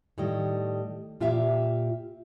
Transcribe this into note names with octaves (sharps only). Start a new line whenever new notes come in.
A2 D#3 G3 D#5
A#2 F4 G4 E5 F5